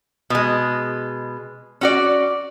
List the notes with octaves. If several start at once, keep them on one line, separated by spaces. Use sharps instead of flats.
B2 G#3
C#4 F#4 D5